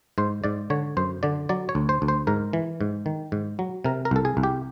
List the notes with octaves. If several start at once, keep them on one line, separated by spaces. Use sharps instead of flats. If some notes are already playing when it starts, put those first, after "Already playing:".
G#2 C5
G#2 D5
D3 C#5
F#2 C5
D3 D5
F#3 D5
C#5
D2
C5
D2
C5
G#2 A#4
E3
G#2
D#3
G#2
F#3
C3 A#4
A#4
C2 A4
G#4
C2
G4